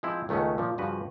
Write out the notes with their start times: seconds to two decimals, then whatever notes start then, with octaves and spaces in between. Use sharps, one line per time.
0.03 F3 G#3 C4 E4
0.29 C#2 D#3 A3 B3 C#4
0.58 A#2 F3
0.78 G2 C#3 F3 F#4 B4